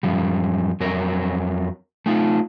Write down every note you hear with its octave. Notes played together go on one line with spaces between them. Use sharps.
F#2 F3 G3
F2 F#3 A#4
A3 D#4 F4